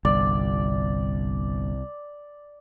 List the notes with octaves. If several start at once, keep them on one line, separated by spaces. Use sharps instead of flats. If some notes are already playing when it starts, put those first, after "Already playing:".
G1 C2 D5